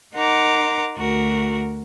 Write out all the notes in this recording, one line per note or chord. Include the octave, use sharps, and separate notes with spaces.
D#4 A#4 F#5 A#5 C6 D6
D2 F#4 A#4